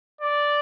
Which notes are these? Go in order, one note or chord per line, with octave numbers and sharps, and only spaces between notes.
D5